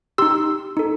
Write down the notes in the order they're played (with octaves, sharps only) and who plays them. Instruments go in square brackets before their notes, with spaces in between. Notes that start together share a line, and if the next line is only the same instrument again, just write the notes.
[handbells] D#4 G4 C6 E6
D#4 A4